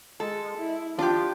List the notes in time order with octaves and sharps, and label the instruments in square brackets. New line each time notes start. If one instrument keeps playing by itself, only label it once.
[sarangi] G#3 [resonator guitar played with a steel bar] A4
[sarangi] E4
[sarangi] F3 [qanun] D4 D6 [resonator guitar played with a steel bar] F4 G4